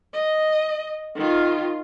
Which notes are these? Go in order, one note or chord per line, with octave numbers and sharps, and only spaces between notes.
D#5
D#3 F4